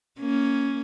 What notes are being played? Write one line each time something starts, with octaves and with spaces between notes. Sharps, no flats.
A#3 C#4